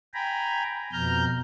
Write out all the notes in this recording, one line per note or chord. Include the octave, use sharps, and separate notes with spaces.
G5 G#5 A#5 B5
F2 B2 A#5 F6 G6